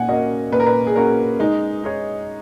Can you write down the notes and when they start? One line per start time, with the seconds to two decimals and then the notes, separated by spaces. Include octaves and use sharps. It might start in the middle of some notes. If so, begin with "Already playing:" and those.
Already playing: A#2 F#5 G#5
0.08 A#3 C#4 F#4 D#5
0.52 A#2 B4
0.60 A#4
0.67 B4
0.87 G#4
0.95 A#3 C#4 F#4 A#4
1.40 G#3 D#4
1.84 D#4 G#4 C#5